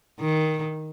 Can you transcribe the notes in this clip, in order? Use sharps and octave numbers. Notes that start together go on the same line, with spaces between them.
D#3